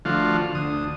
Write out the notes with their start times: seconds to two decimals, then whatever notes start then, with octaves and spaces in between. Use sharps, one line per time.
0.05 D3 F3 A3 F4 F#4
0.55 D2 D#6